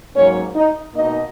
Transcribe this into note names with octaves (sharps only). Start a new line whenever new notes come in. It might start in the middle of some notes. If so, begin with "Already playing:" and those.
G#2 F#3 A#3 C#4 C#5
D#4 D#5
B2 A#3 D#4 D#5